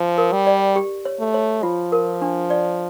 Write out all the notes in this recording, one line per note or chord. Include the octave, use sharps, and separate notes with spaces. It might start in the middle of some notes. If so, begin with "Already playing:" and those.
Already playing: F3
A#4
G3
D5
G4
C#5
A3
C#5
F3 F4
A#4
D4
D5